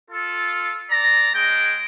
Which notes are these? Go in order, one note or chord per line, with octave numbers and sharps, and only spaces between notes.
F4 A4
D5 A#5
G#3 G5